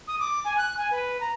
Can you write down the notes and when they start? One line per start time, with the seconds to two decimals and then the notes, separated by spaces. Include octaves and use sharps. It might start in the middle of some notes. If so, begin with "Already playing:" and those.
0.08 D#6
0.19 D6
0.45 G#5
0.58 F#6
0.77 G#5
0.91 B4
1.21 A#5